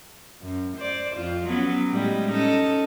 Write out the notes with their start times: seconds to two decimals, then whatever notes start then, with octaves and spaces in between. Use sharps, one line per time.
0.42 F#2
0.78 C5 D5
1.16 F2 F4
1.47 F#3 B3 C#4
1.89 A2 G3 G#3
2.30 C#4 D#4 A4